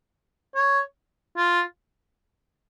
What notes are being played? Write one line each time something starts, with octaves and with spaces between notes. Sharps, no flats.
C#5
F4